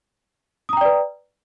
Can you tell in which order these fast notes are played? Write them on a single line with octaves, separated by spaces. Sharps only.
D#6 A#5 G5 D5 B4